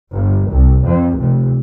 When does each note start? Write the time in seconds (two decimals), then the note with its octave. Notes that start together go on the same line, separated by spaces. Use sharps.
0.11 G1
0.49 C2
0.83 F2
1.18 F1